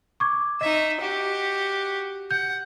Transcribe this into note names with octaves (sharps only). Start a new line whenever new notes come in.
C#6 D6 G#6
D#4 D#5 E5
F#4 G4
F#5 G6